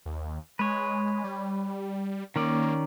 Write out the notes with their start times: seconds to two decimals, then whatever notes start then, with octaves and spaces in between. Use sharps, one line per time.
0.06 D#2
0.59 G#3 B4 C#5
1.24 G3
2.36 D#3 A#3 C#4 D5